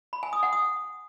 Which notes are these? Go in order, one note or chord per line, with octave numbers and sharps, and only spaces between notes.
B5
G#5
D#6
F#5
D#6